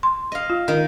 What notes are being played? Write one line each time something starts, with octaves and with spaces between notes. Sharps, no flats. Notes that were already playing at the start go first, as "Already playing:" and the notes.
C6
D#5 F5
F4
D#3 D#5